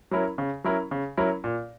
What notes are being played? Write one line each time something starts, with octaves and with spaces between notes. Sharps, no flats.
F#3 C#4 E4 A#4
C#3
F#3 C#4 E4 A#4
C#3
F#3 C#4 E4 A#4
A#2